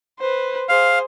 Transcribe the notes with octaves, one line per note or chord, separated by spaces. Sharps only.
B4 C5
G#4 C5 F5